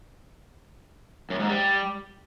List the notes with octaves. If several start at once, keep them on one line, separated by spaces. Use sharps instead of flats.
F#2
G#2
G3